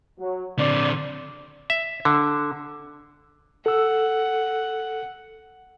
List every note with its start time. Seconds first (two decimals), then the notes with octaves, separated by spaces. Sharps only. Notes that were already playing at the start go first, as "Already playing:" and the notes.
0.19 F#3
0.58 D3 C4 D5
1.70 E5
2.05 D3
3.66 A4 F#5 E6